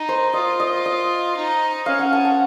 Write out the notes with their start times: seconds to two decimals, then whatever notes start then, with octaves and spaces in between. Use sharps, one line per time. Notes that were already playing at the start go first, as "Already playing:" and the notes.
Already playing: D#4
0.08 C5
0.33 F4 D#5
0.60 D#5
0.85 D#5
1.36 D#4
1.86 C#4 F5
1.99 F#5
2.13 A5
2.25 F#5